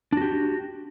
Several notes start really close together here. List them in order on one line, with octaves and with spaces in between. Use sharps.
D4 F#4 G4